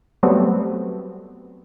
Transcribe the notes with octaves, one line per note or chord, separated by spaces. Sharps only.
F#3 G3 A3 B3 C4